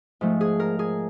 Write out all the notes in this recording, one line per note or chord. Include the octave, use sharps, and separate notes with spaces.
G#2 F3 A3
G#4
A#4
G#4